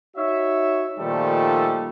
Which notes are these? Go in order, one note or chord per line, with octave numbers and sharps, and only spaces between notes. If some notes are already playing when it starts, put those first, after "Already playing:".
D#4 F#4 C#5 E5
A#2 D#3 F3 G3 A3 A4